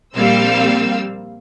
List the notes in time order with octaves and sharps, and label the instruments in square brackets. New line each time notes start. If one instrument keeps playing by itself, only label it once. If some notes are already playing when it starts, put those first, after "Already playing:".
[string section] A#1 G3 A#3 C4 F5 E6